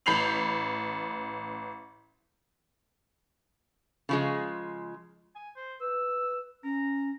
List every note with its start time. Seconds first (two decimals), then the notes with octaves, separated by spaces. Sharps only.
0.06 A1 B5 G6 C7 F7 F#7
4.09 C#3 F3 G#3
5.35 G#5
5.56 C5
5.81 B4 E6
6.63 C#4 A#5